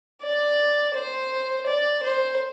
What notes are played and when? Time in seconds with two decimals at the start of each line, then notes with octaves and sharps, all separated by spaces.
0.22 D5
0.94 C5
1.66 D5
2.03 C5